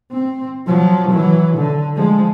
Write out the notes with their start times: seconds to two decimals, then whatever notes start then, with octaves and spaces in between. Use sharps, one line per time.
0.11 C4
0.66 F3 F#3
1.10 E3 F#3
1.57 D3
1.96 F3 G#3